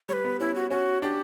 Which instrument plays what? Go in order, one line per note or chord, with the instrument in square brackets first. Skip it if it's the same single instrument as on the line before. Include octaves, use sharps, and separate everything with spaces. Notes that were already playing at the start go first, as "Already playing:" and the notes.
[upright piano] G3 [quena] C#5
[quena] B4
[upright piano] B3
[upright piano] C#4 [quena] E4
[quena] F#4
[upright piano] C#4 [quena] F#4
[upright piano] D4 [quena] G4